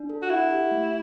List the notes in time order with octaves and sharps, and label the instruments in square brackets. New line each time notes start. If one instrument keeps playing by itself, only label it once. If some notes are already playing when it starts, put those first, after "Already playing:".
Already playing: [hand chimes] D4
A4
[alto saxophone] F#4
[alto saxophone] E4 [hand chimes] F#5
[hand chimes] G4
A3